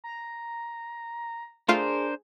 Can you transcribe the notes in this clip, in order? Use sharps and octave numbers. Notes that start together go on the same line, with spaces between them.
A#5
A3 D4 F4 G#4 A#4 C5 F5